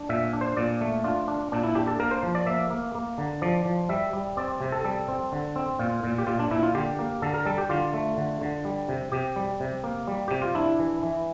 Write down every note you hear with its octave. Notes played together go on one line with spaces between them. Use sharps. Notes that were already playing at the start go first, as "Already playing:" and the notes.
Already playing: D4
A#2 E5
D4
C5
A#2 D5
A3
D4 F4
D4
A#2 D4
E4
D4 G4
A4
A#3 A#4
C5
F3
D5
A#3 E5
A#3
A#3
D3
F3 D5
F3
G3 E5
G3
C4 D5
C3
A4
G3 A4
C4
D3
C4
A#2 F4
A#2
G4
A#2 F4
D4
A#2 E4
F4
D3 G4
A#3
D3 A4
A#4
G3 A4
G4
D3 F4
A3
D3
D3
G3
C3
C3 G4
G3
C3
A#3
G3
C3 G4
F4
D4 E4
E3
E3